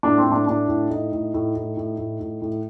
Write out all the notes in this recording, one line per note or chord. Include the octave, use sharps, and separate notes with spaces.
A2 D4
C4
A2
D4
A2 D4
A2
A2 D#4
A2
A2
A2
A2
A2
A2
A2